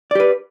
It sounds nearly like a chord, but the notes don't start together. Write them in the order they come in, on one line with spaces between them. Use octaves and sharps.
D5 G4 B4